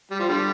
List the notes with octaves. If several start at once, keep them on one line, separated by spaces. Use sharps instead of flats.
G3
F3
D3 G3